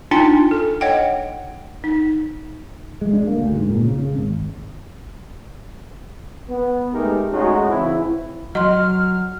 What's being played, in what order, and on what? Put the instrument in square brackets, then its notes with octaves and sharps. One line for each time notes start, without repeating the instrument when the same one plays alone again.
[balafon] D4 D#4 F4 G5 G#5 C6
A4
C#5 D#5 F#5 G5
D#4
[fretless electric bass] G#3
D4
A#3
D2
G#2
A#2
C#3
C#3
G#1
[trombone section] B3
G#3 A3 B3 D#4 G4 A#4
A2 G#3 C#4 D#4 F#4
C#3 E3 C4 E4
[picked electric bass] F#3 [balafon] D#5 C6 [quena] F6